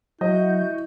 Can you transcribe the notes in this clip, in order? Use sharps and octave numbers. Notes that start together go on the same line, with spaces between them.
F#3 E4 F#4 D#5 G6